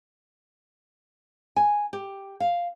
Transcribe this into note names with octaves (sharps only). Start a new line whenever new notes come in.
G#5
G4
F5